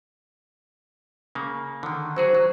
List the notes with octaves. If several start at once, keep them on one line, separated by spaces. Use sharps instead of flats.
C#3 A#3
D3 D#3
F#3 F#4 G#4 C5
F#3